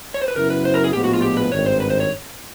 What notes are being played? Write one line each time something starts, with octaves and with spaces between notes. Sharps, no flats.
C#5
C5
B4
F#2 C#3 F#3 B3 E4 A#4
B4
C5
A#4
G#4
A#1 A2 F3 G#3 B3 G4
F#4
F4
G4
B4
G#1 G2 D#3 C#5
C5
B4
C5
C#5